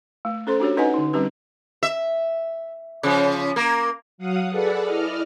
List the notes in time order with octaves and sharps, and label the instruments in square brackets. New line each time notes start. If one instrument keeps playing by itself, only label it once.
[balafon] A3
C#4 A4 C5 C6
D4 F#4 G4 C#5
C#4 D#4 B4 D#5 F#5 G#5
D3 D#4
G3 C4 C#4 G4 B4
[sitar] E5
C#3 F3
A#3 A#4
[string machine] F#3 F5 F#5 D#6
G#4 A4 B4 D5 F#5
E4 D5 D#5 F6